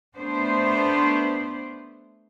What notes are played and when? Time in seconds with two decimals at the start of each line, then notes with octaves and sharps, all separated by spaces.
0.17 A3 B3 D4 C5